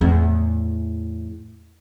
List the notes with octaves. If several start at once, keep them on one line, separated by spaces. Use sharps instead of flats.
E2 A2